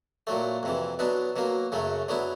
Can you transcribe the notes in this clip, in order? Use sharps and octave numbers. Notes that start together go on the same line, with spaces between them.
A#2 F#3 A3
F2 C3 E3
B2 F#3 B3 D4
B2 F#3 A#3
F#2 C#3 F#3 A3
D3 F#3 B3 E4